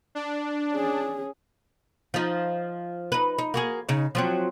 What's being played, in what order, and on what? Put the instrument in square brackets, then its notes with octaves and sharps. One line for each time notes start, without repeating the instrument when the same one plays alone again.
[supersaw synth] D4
[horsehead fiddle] C#4 G#4
[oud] F3 D#4
D#4 B4
D#4
A#3 F#4 G#4
C#3 D#4
F3 F#3 C4